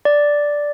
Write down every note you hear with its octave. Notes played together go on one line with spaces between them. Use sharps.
D5